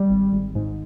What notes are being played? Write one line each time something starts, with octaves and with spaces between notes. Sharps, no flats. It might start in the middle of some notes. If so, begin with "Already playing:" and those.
Already playing: G3
G#1
G#1
G#2